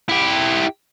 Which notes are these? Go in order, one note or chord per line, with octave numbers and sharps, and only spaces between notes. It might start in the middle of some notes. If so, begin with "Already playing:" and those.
E4 G4